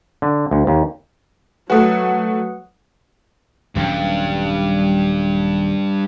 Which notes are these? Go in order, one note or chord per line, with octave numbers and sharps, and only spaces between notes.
D3
D2
D#2
F#3 A3 F#4 B4 F#5 D#6
D#1 G2 F#3 C#4